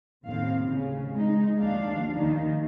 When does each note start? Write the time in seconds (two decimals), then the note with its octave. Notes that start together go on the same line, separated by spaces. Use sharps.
0.24 D#2 A2 C3 C4 F5
0.67 C#3
1.11 G#3 D#4
1.59 D#2 F3 D4 F5
2.14 D#2 D#3 D#4